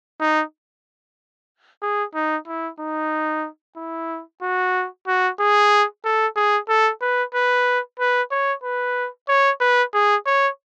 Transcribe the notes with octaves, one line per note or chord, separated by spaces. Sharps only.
D#4
G#4
D#4
E4
D#4
E4
F#4
F#4
G#4
A4
G#4
A4
B4
B4
B4
C#5
B4
C#5
B4
G#4
C#5